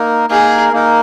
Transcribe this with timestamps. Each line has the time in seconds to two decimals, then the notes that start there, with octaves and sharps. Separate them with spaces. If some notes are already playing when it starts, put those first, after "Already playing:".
Already playing: A#3 D#4 A#4
0.30 A#3 D#4 G#4 A#4
0.73 A#3 D#4 A#4